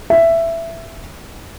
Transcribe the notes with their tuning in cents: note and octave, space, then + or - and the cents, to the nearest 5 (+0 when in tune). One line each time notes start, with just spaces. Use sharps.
E5 +10